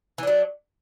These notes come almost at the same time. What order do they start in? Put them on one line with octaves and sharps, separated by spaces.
E3 D4 F#3